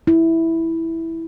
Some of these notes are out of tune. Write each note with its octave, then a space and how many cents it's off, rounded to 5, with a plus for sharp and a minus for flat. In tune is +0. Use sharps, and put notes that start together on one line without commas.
E4 -5